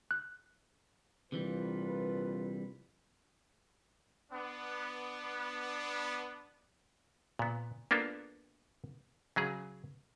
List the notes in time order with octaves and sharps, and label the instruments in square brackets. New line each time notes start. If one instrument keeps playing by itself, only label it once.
[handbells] F#6
[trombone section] A#1 F4 B4 [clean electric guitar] C3 E3 G3
[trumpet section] B3 D4
[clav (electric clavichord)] A#2 B3
A#3 B3 D4 F4 A4
C#3 F#3 G#4